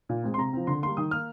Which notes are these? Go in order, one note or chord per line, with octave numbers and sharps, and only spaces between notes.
A#2
G#3 C4
C6
C3 A#5
F3 C4
D3 C6
G3 A#3 C6
D#3 D#6
A#3 F6